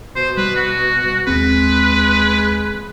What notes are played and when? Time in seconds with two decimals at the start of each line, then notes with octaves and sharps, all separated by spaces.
0.16 B2 C5
0.37 G3 B4
0.56 F#4
1.27 D#2 G#3 C4 B4